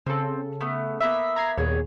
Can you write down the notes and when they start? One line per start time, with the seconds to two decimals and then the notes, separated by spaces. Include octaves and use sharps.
0.06 C#3 C4 A4
0.61 A3 B3
1.00 A#3 B3 E5
1.36 A#5 G#6 C7
1.58 D#2 A#2 B3 G#4 C#5